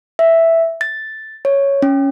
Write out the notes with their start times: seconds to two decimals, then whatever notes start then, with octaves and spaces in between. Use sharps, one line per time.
0.19 E5
0.81 A6
1.45 C#5
1.82 C#4